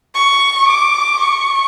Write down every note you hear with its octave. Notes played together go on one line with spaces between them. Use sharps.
C#6
D6
C#6